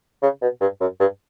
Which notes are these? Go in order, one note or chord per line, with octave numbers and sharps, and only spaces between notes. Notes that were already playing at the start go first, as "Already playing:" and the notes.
C#3
B2
G2
F#2
G2